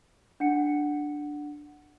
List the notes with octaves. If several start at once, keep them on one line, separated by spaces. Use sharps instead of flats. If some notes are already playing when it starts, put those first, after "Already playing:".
D4 F#5 C#7